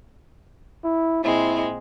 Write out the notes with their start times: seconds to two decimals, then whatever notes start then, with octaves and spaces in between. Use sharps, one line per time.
0.84 E4
1.24 A#2 G#3 C4 E4